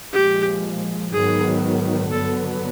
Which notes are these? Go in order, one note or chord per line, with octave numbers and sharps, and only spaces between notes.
A#2 F3 G#3 G4
G#2 D#3 F#3 B3 G#4
G2 D3 F#3 B3 A4